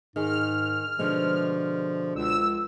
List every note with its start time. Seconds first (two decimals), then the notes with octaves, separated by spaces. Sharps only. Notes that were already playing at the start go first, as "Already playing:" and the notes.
0.16 G#2 D#3 G#4 F6
0.99 B2 D3 F3 G#3
2.16 C#2 E6